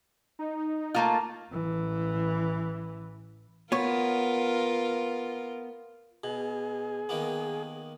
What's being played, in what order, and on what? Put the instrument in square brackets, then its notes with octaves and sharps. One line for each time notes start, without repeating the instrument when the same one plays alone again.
[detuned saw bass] D#4
[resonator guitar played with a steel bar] A3 A#3 F4
[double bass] A1 E3
[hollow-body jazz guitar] B3 C#5 [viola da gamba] F4 A#4
[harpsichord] B2 [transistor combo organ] G#4
[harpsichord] D#3 A#3 B3